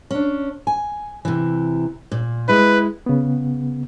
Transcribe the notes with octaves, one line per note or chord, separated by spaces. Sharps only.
C#4 D4
G#5
C3 E3
A#2
G#3 E4 B4
C#3 B3